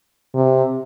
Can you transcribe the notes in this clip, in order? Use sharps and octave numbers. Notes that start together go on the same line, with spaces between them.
C3